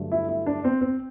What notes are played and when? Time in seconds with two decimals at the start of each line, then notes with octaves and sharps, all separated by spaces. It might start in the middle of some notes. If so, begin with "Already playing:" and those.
Already playing: G2 D3 F#3 A3
0.12 E4
0.29 E4
0.46 D4
0.64 C4
0.81 C4